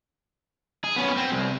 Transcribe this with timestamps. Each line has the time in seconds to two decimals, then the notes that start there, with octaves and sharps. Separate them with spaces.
0.84 G#4
0.96 B3 C#4
1.17 C4
1.32 C2